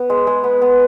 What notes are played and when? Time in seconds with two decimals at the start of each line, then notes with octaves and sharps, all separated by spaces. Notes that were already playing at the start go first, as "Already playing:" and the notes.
Already playing: B3
0.10 G#3
0.27 G#3
0.44 B3
0.61 B3